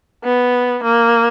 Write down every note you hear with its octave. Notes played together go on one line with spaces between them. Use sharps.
B3
A#3